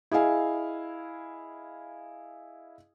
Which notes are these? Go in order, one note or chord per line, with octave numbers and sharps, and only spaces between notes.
E4 G#4 D#5 F5 G#5